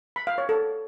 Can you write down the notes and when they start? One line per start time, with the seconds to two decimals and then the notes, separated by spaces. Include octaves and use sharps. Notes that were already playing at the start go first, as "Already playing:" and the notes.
0.16 B5
0.27 F5
0.38 C#5
0.49 A4